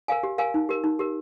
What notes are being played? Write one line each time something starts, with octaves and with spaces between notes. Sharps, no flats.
A#4 F5 G#5
G4
A#4 F5 G#5
D#4
G4 A#4
D#4
G4 A#4